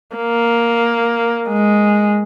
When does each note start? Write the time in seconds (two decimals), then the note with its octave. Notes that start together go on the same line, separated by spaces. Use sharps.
0.17 A#3
1.48 G#3